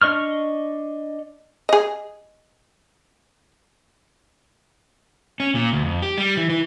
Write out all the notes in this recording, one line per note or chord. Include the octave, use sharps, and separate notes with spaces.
D4 D#5 C#6 F6
G#4 D#5
C#4
A#2
D2
F2
G4
G3
E3
E3